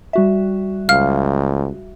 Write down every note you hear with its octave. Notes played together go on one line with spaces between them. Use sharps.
G3 F#4 E5
C#2 F5 F6